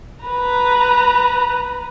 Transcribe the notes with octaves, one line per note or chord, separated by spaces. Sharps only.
B4 A#5